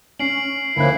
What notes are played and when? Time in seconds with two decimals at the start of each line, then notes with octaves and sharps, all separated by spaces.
0.19 C#4 C7 D7 F#7
0.76 D2 F3 A#3 C#4 E4 F#6